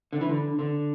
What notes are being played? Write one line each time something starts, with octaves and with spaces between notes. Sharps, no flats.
D3
E3
D3
D3